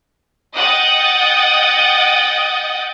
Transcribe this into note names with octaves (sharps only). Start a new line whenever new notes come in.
D#5 F#5 G5 D#6 G6 A6